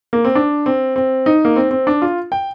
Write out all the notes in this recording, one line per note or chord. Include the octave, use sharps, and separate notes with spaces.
A#3
C4
D4
C4
C4
D#4
A#3
C4
C4
D4
F4
G5